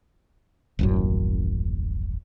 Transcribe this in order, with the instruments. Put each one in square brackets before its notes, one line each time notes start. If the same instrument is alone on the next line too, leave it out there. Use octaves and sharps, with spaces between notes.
[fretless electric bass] D#1 A1 F#2